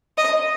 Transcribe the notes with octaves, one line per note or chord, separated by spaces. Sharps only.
D#5